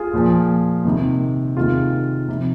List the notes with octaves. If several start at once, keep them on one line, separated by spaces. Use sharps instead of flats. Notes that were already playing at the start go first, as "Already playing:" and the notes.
Already playing: F4 G#4
A#2 F3
C3 D#3
C3 D#3 F4 G#4
C3 F3